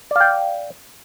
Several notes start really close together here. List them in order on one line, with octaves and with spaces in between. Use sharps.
D5 F5 G5